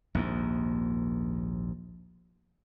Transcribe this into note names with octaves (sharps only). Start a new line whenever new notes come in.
A#1 D#2 G#2